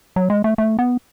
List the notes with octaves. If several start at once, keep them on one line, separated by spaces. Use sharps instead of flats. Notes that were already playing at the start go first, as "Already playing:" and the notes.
F#3
G#3
A3
A3
B3